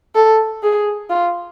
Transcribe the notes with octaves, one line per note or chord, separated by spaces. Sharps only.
A4
G#4
F4